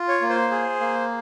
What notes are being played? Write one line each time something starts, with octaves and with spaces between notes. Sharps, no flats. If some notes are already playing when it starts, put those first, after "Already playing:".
Already playing: F4
C#5
A#3
C5
G#4
A#3